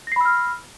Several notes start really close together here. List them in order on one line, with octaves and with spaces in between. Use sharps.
A#6 C7 B5 E6 F6